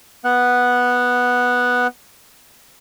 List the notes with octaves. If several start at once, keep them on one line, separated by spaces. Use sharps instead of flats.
B3 F#5